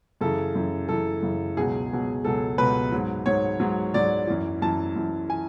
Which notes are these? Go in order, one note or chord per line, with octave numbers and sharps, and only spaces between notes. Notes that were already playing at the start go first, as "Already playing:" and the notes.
F#2 C#3 E3 A4
F#2 C#3 E3
F#2 C#3 E3 A4
F#2 C#3 E3
C#2 B2 F#3 G#4
C#2 B2 F#3
C#2 B2 F#3 A4
C#2 B2 F#3 B4
G#2 F#3
G#2 F#3 C#5
G#2 F#3
G#2 F#3 D5
F#2 E3
F#2 E3 A5
F#2 E3
E3 G#5